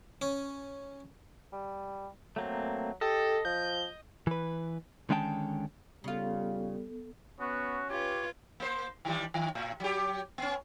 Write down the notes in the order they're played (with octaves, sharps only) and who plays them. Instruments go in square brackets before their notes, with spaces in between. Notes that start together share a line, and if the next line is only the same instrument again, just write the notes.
[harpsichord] C#4
[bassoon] G3
[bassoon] F#3 [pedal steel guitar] A3 A#3 C4
[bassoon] G4 [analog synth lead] A4 [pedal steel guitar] D#5
[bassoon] F3 [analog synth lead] G6
[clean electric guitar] E3 B4
D3 D#3 G#3 C#4 G5 A5
[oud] C#3 F4 [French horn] G3 [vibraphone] B3 A4
[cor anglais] B3 [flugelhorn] C#4 [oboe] F#4
[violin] F4 B4 [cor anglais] G4 [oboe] C#5
[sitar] A#3 C5
D#3 E3 G3
D#3
A2
F#3 G4
B3 C#4